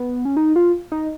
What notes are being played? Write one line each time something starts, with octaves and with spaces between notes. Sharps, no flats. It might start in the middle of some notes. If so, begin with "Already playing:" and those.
Already playing: B3
C#4
D#4
F4
D#4